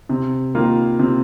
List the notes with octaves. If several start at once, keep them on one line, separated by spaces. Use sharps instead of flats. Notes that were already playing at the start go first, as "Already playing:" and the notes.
C3
D#3 A#3 F4
C3